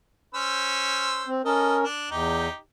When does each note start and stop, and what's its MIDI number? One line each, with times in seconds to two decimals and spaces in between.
0.35 1.32 61
0.35 1.32 72
0.35 1.32 88
1.27 1.42 60
1.45 1.85 61
1.45 1.77 69
1.45 1.85 70
1.45 1.77 75
1.84 2.07 62
2.11 2.48 40
2.11 2.57 63
2.11 2.57 67